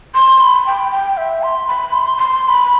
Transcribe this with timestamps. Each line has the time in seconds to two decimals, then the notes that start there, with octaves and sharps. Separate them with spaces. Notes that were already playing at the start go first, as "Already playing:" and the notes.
0.14 C6
0.40 B5
0.66 G5
0.91 G5
1.17 E5
1.43 C6
1.67 B5
1.93 C6
2.18 C6
2.44 C6
2.48 B5